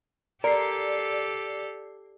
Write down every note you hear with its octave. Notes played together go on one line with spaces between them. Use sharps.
G4 A4 A#4 D5 C7